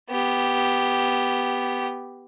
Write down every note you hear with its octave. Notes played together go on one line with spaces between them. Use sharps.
B3 G4